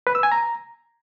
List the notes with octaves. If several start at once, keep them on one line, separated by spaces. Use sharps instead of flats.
B4
E6
G#5
A#5